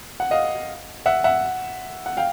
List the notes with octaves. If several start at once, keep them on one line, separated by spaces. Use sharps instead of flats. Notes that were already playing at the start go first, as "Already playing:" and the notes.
F#5
D#5 F5
E5 F#5
E5 F#5
F#5
F5 G5